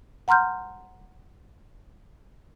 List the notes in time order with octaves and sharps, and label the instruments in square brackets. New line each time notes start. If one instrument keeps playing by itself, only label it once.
[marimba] F#5 A#5 C6 F6 G6